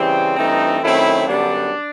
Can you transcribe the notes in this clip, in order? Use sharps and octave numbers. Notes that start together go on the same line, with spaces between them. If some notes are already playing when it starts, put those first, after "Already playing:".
Already playing: C#3 E3 G3 C4
G2 E3 A3 C4 D#4
F#2 D#3 F#3 A3 C4 E4
F#2 D3 G3 B3 D4